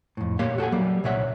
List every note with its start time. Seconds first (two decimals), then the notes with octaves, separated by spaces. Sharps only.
0.17 F2 A2
0.39 A#2 A#3 G4 C#5 F5
0.58 F#4 A4 F#5 G#5
0.72 F#3 G3 A#3
1.04 C2 A#2 C#5 E5 F#5